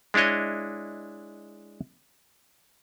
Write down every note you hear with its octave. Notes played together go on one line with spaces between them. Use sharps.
G#3 D4 E4 C#5 D#5